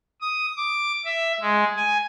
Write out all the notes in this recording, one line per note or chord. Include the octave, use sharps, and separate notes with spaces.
D#6
D6
E5
G#3
G#5